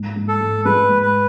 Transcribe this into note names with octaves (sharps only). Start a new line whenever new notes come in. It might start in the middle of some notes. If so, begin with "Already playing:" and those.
Already playing: G#2
G#2
A4
G#2
G#3 B4
G#2
B4